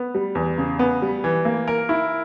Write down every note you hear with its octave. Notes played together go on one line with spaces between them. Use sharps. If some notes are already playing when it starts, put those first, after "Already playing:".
Already playing: B3
G3
E2
C#3
B3
G3
E3
A#3
A#4
E4